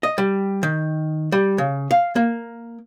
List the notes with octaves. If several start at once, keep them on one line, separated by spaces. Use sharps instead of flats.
D#5
G3
D#3
G3
C#3
F5
A#3